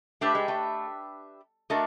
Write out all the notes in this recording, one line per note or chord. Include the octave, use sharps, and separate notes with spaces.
A3 D4 G4 B4 E5
G#3
A3
A3 D4 F#4 A#4 D#5